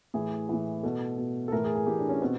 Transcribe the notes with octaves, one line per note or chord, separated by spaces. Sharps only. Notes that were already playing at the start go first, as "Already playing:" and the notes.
A2 E3 G#4
A2 E3
B2 A4
B2
A4
A2 E3 A#4
G#4
G#4
A2 E3 G4
D4
C#4
B2 C4